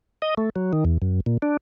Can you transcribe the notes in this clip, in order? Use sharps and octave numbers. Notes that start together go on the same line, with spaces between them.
D#5
A3
F#3
D#3
E2
F#2
A#2
D4